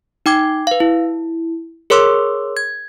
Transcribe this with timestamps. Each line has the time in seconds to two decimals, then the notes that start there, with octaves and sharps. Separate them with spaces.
0.26 D#4 G5 D6 G#6
0.67 B4 F5
0.80 E4
1.90 G#4 A#4 C#5 C6 D6 E6
2.57 G#6